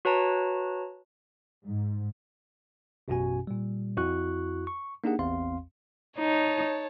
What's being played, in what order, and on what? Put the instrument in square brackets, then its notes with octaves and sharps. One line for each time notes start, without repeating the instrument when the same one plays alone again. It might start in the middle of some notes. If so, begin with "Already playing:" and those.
[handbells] F#4 B4 C#5 A5 A#5
[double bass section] G#2
[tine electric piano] A1 F#2 B2 C#4 F#4 G#5
A#2 G3
F2 E4 F#4 C#6 F#6
C#6
A#3 D4 D#4 G4 G#4 F#5
A1 E2 C4 F5 C6
[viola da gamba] D#4 [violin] C#5 A5